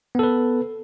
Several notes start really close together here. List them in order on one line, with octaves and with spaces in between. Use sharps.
B3 A4 B4